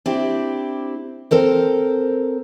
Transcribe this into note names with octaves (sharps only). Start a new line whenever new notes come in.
C4 D4 E4 G4
C4 A4 A#4 C5